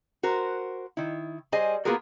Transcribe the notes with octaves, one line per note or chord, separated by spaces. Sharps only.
F#4 A#4 C5
D#3 E4
G3 G#4 C5 D#5 G#5
A#3 B3 F4 F#4 G#4 A#4